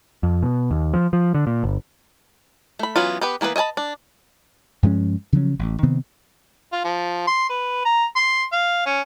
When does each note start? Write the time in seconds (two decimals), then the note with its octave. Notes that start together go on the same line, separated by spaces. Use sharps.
0.23 F2
0.43 B2
0.71 D#2
0.93 F3
1.13 F3
1.35 D3
1.47 A#2
1.64 G1
2.79 A3 B5
2.96 E3 F#3 B3 C#4 F4
3.21 B3 G4 B4
3.41 E3 A#3 B3 D#4 B4
3.56 D#5 E5 G#5 A5 B5
3.77 D4
4.83 G2 F3 G#3 C#4
5.33 C#3 F3 F#3 C#4
5.59 A1
5.83 C3 D#3 B3 C4
6.73 F4
6.84 F3
7.27 C6
7.49 B4
7.85 A#5
8.16 C6
8.52 F5
8.86 C#4